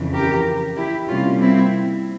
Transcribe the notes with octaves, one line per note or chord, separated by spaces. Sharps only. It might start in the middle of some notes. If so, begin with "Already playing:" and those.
Already playing: F2 C#3 E3
G4 A#4
E4 G4
C3 G3 A#3 C#4 F4
C4 E4